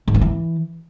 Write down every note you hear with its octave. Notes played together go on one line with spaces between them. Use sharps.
G#2
F3
E3